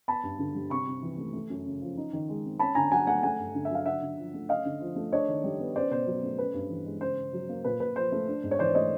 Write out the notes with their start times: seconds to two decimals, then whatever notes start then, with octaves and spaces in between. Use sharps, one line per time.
0.08 B3 A5 B5
0.23 G2
0.39 D3
0.55 G3
0.70 C3 B5 C#6
0.87 C3
1.02 E3
1.18 A3
1.33 A3
1.50 F#2
1.66 C#3
1.81 F3
1.97 D#4
2.13 D#3
2.29 G#3
2.44 C4
2.59 C#4 A5 B5
2.75 D3 G#5 A#5
2.92 F#3 F#5 G#5
3.07 A3 F#5 G#5
3.23 A3 F#5 G#5
3.39 G2
3.55 D3
3.65 E5
3.70 F#3 F5
3.86 D3 E5 F#5
4.02 D3
4.18 F3
4.34 A3
4.49 C#4 D#5 F5
4.65 D3
4.80 F3
4.96 A3
5.12 D4 C#5 D#5
5.28 D#3
5.44 G3
5.59 B3
5.75 C#4 C5 D5
5.91 B2 C5
6.07 F#3
6.23 A3
6.39 C#4 B4
6.54 G2
6.70 E3
6.86 G#3
7.01 C#3 C5
7.18 C#3
7.33 F#3
7.49 A#3
7.64 A#2 B4
7.80 A#2 B4
7.96 F3 C5
8.12 A3
8.28 D4
8.44 G#2
8.51 C#5
8.59 E3 C5 D5
8.75 A3 C#5 D#5